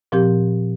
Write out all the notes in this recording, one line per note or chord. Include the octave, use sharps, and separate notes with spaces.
A#2 F3 C4 G4